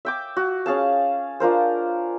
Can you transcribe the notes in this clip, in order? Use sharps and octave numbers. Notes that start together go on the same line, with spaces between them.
E5 G5 D6
F#4
C#4 G#4 F5 A5
D4 F4 A#4 C5